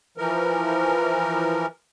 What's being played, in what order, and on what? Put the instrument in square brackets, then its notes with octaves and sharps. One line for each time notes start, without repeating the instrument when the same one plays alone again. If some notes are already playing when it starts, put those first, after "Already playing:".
[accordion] E3 F3 A#4